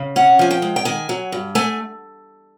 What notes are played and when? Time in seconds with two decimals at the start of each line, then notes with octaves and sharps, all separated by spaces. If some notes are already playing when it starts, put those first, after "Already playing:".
Already playing: C#3
0.16 C#4 F#5
0.39 F3 G#5
0.51 G5
0.62 G#3
0.76 G5
0.85 D#3 G#5
1.09 F#3
1.32 G2
1.55 A3 G#5